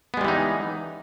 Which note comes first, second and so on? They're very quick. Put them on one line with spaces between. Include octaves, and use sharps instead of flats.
B3 G#3 G3 E3 D#4